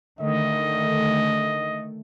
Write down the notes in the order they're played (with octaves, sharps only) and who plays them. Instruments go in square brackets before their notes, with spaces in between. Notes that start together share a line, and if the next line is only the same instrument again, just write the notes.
[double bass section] D3 D#3 [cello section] A3 [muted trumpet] D#5